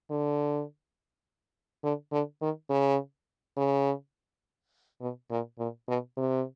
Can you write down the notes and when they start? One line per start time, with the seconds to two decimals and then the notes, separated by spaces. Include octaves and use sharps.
0.11 D3
1.84 D3
2.12 D3
2.42 D#3
2.70 C#3
3.57 C#3
5.01 B2
5.31 A#2
5.59 A#2
5.88 B2
6.17 C3